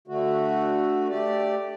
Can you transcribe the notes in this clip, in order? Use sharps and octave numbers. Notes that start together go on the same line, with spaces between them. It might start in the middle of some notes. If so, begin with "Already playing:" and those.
D3 A3 F#4
A3 G4 D5